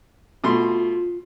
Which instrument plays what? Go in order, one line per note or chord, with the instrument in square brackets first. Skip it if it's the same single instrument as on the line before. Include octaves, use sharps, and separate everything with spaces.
[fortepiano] B2 A3 C6 [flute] F4